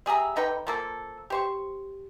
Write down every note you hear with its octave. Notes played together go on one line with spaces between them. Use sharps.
G3 G#4 E5 A#5
D3 D#4 B4 G5
F3 A#3 A4
G4 C5 C#6